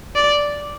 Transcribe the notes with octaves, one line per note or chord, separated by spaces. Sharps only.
D5